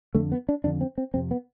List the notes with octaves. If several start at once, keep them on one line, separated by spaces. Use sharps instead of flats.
F2 D3 A3
B3
D4
F2 D3 D4
C4
C4
F2 C3 C4
B3